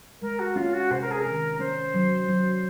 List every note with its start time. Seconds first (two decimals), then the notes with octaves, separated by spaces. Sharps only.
0.22 G#3 A#4
0.39 F#4
0.56 C#4 F4
0.73 F#4
0.91 C3 C5
1.01 A#4
1.11 G#4
1.21 A#4
1.26 D#3
1.59 C#4 C5
1.94 F#3
2.28 F#3